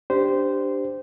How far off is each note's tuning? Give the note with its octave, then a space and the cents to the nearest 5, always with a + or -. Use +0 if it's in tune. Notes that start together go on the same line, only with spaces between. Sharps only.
D4 -5 G4 +0 C5 -15